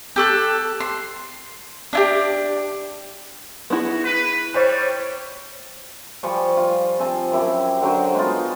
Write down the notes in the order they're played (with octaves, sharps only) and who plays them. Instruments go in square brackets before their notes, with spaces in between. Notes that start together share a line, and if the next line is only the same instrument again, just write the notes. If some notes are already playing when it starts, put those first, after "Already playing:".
[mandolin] G4 A4 F#6
C6
D4 E4 G4
[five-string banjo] B3 E4 G#4 [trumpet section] F#4
[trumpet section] B4
[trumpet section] G3 [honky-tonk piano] C5 C#5
[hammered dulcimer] F3 G3 G#5 C#6
F4
C4 G#5 A5
F#2 E4 G4
D3 F#3 A#4 C5
G#3 B3 D#4 F4